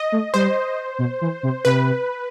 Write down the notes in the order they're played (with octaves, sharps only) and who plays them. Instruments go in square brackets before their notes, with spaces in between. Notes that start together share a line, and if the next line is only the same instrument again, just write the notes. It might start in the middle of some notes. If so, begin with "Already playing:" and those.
Already playing: [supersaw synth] D#5
[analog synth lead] A3
[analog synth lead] G3 [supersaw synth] C5
[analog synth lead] B2
E3
C3
[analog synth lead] C3 [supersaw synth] B4